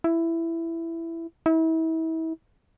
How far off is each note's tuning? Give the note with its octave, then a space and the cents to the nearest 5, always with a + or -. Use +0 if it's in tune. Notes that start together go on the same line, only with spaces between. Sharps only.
E4 +10
E4 -35